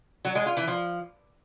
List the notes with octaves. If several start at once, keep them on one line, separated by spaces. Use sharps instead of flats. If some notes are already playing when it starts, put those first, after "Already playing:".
F#3
G#3
F4
E3
F3